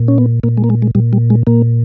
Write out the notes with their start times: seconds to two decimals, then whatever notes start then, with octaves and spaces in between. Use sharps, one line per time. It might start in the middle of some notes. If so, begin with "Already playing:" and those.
Already playing: A#2
0.08 C#4
0.18 B3
0.43 A#2 A#3
0.57 G#3
0.64 A#3
0.70 G#3
0.82 G#3
0.95 A#2 G3
1.13 G3
1.30 G#3
1.47 A#2 A#3